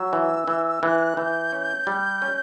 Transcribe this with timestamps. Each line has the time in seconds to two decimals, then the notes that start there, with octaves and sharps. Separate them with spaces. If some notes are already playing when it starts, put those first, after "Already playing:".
Already playing: F#3 E6
0.13 E3
0.48 E3
0.82 E3 F#6
1.17 E3 G6
1.52 C#4
1.87 G3
2.22 C#4